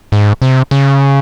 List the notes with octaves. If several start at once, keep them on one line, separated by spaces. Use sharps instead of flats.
G#2
C3
C#3